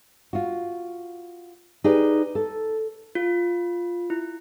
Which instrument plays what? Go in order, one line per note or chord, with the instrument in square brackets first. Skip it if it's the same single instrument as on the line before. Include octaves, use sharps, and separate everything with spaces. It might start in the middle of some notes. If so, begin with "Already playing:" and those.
[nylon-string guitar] F4 F#4
D#4 G4 G#4 B4 D5
A4
[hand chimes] F4
E4